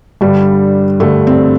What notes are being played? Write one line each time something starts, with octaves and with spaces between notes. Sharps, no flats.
G2 D3 G3
G2 D3 G3 A3
C4